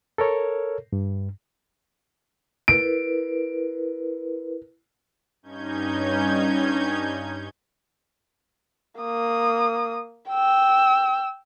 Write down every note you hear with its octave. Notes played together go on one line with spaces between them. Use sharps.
A4 A#4 C#5
G2
E4 A#4 B4 D7
G2 C#4 D#4 G6 G#6
A#3 D#6
G5 E6